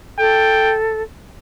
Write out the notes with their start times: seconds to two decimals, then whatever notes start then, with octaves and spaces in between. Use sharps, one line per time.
0.18 A4 G5